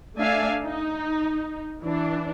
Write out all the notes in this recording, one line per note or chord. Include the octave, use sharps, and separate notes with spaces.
A3 D4 D5 E5 F5 G#5
D#4
E3 D4